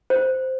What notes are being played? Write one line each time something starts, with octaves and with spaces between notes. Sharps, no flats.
C5